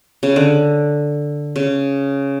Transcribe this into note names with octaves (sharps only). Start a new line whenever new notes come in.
C#3
D3
C#3